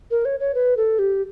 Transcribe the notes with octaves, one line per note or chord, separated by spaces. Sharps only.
A#4
C#5
C#5
B4
A4
G4